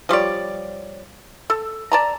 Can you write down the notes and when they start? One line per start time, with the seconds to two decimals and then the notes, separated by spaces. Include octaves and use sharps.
0.09 F3 G3 C#5 D5
1.50 A4
1.92 D5 A5 A#5